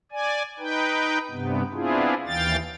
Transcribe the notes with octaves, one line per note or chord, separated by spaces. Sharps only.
D5 G#5
D#4 B4 G5
G2 C3 B3
B3 C4 D4 E4 F4 G#4
D#2 E3 F5 G5 A6